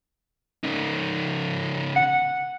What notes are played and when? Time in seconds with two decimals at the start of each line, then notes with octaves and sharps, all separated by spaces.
0.64 C#3 D#4
1.96 F#5